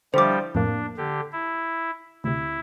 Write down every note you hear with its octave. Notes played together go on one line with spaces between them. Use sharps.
D3 F3 G3 E4 G4 C5 D6
F2 A2 A#3 D4
D3 G4
E4
D2 C3 E4